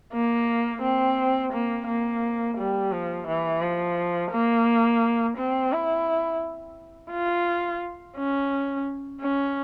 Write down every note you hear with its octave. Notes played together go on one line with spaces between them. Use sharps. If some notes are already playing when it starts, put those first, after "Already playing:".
A#3
C4
A#3
A#3
G3
F3
E3
F3
A#3
C4
E4
F4
C#4
C#4